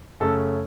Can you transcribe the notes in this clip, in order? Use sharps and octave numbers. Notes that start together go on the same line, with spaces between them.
F#2 C#3 A3 C#4 A4